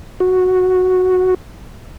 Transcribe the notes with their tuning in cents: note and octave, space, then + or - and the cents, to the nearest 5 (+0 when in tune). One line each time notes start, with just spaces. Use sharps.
F#4 -5